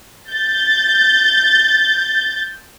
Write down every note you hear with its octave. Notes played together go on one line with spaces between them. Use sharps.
G6 A6